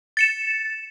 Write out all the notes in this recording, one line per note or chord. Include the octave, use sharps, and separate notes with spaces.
A6 C#7 E7